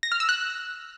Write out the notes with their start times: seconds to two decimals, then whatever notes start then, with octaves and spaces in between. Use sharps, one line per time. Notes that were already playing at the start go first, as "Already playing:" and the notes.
0.03 A#6
0.12 F6
0.20 E6
0.29 F#6